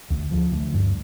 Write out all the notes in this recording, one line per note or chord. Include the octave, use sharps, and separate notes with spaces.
D2
F3
D2
G2